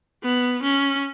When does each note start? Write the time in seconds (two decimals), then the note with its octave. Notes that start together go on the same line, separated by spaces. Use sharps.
0.24 B3
0.63 C#4